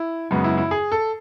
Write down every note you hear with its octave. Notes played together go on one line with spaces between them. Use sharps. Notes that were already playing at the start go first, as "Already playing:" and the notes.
Already playing: E4
F#2 C#3 G#3 B3
E4
E4
G#4
A4